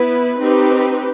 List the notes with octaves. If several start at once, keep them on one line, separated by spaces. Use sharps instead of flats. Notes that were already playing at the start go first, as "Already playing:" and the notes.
Already playing: B3 E4 B4
C4 D#4 G4 B4